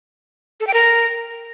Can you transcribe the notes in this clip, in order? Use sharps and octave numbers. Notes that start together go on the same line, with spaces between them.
A4
G5
A#4